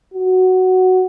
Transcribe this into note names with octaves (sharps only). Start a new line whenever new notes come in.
F#4